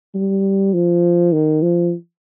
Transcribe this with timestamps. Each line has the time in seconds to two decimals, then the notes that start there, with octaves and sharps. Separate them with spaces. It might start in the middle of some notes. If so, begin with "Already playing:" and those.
0.15 G3
0.74 F3
1.33 D#3
1.62 F3